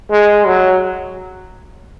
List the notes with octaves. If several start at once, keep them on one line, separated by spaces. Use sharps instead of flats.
G#3
F#3